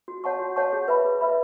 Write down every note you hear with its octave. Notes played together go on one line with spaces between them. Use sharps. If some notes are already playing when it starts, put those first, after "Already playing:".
F#4
C#5 F#5 A5 C#6
F#4
C#5 F#5 A5 C#6
G#4
B4 E5 B5
G#4
B4 E5 B5